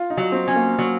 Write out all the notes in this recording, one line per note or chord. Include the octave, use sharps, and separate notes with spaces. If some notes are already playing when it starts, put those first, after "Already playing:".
Already playing: F4
D#4
F#3
C4
C#4
A#3
F#3